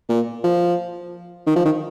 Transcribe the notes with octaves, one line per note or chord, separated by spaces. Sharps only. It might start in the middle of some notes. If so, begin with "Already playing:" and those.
A#2
F3
D#3
F3
D#3